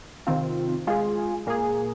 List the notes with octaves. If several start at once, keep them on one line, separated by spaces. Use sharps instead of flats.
C3 D#3 C4 F4
G#3 F4 G#4
A#2 A#3 G#4